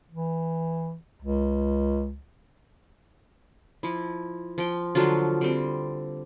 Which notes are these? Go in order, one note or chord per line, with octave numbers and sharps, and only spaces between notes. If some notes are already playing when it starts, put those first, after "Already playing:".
E3
C#2
F3 E4
F3 G5
D3 F3 F#3 F4
D3 G3 C4